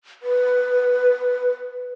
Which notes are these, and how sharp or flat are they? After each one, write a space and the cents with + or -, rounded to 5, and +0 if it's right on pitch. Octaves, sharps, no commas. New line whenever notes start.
B4 +5